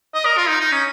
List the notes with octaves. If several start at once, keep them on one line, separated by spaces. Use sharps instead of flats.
D#5
A#4
F4
D#4
D#4
C#4